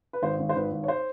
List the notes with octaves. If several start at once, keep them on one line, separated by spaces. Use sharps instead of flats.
B4
G#1 C5
G#1
C5
G#1 B4
G#1
C#5
C5